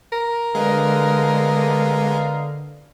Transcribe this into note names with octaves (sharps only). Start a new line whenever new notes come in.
A#4
D3 G#3 B3 D#5 F5